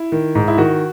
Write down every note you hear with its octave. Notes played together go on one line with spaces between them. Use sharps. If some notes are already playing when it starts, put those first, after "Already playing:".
Already playing: E4
D#3
G#2
E4
D#3 F#4